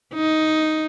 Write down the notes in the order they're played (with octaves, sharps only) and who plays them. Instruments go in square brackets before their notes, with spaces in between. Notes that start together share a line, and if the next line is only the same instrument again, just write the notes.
[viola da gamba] D#4